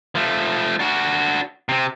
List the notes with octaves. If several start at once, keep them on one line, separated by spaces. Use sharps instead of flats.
F3 A3
D4 F#4
C3 C4